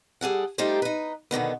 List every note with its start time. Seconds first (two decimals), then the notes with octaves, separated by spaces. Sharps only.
0.21 G3 G#4 A4 F#5
0.58 G3 A3 D#4 F4 G4 C5
0.82 D#4 B4
1.31 B2 D3 D#3 B3